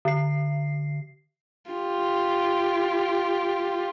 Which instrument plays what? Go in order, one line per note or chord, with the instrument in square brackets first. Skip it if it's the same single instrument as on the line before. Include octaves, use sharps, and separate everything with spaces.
[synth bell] D3 C7
[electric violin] F4 G4